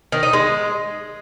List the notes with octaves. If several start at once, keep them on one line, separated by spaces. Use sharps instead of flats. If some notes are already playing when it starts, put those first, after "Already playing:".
D#3
D#4
G#3